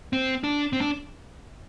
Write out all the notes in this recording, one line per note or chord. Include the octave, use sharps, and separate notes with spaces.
C4
D4
C4
D4